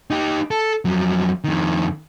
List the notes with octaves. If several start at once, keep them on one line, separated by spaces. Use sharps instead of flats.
D#4 G4
A4
F2 F#3
F2 D#3